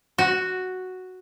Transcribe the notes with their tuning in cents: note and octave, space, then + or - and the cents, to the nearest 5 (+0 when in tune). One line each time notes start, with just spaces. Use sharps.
F#4 +0